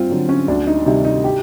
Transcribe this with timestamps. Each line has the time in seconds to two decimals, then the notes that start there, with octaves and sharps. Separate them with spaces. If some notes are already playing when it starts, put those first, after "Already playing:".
Already playing: G2 C4 F4
0.10 D3 F#3
0.29 C#4
0.48 D2 D4
0.67 D#4
0.86 C3 D#3 G3 D#4
1.05 D#4
1.24 G4